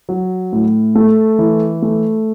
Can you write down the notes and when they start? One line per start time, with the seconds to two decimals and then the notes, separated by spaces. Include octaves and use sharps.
0.09 F#3
0.53 A2
0.95 A3
1.39 E3
1.82 A3